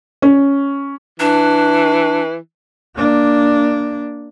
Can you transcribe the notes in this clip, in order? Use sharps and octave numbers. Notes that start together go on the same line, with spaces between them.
C#4
E3 D4
A#3 D4